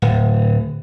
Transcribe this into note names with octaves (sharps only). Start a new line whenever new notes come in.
D1